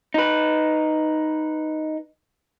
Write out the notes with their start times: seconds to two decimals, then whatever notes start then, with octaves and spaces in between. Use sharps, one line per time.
0.14 D#4 B4